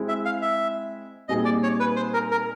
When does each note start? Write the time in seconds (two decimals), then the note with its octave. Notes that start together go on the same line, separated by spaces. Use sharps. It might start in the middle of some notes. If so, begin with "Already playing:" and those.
Already playing: G#3 C4 E4
0.08 E5
0.25 F5
0.42 E5
1.28 A#2 G3 C4 D#4 G#4 D#5
1.45 D5
1.63 C#5
1.80 B4
1.96 C5
2.14 A#4
2.31 A#4